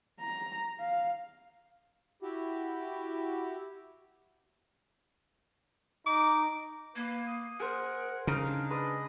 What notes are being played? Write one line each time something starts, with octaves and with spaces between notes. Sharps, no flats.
A#5
F5
E4 F#4 G4
D#4 D6
A#3 B4
D#6
G#4 A#4 C5 F#5
C#3 D#4 A#4 F5
D4
G#3 B4 D5 D#5